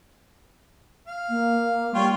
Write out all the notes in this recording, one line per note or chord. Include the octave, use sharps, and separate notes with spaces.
F5
A#3
G3 F4 C#5 G5